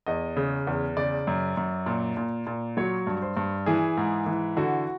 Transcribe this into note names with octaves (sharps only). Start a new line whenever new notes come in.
E2 D#5
C#3
E2
C#3 D5
F#2
F#2
A#2
A#2
A#2
F#3 C#5
G2
C5
G2
E3 G#4
G#2
E3
D3 F#4